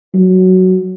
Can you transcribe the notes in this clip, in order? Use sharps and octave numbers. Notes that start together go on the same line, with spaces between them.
F#3